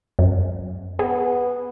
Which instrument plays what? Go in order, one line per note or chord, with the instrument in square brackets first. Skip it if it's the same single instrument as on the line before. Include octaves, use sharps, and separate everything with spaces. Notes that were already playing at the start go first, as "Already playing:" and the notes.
[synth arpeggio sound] F#2
[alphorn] B3 [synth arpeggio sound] G#4